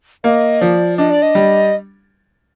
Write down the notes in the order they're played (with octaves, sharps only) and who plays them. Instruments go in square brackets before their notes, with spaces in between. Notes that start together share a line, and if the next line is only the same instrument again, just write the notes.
[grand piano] A#3 [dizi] D#5
[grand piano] F3 [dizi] D5
[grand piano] D4 [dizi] D#5
[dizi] D5
D#5
[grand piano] G3